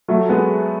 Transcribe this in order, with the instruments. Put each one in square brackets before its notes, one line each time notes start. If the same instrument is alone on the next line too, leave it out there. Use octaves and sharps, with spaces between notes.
[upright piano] F#3 A3
G#3 B3